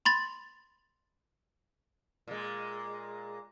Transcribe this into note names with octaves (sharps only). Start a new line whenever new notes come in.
B5 C6 A6
A#2 G#3